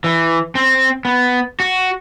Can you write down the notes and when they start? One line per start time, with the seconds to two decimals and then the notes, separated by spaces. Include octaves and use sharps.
0.04 E3
0.55 C4
1.05 B3
1.60 F#4